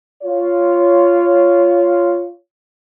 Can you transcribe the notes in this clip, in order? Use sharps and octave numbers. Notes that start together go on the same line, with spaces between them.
F4 C#5